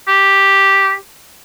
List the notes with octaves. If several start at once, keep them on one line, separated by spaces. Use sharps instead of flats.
G4